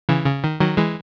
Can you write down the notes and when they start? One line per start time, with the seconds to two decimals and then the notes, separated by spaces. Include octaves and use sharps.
0.09 C#3 E3
0.26 C#3
0.44 D#3
0.60 D#3 F#3
0.77 E3 G#3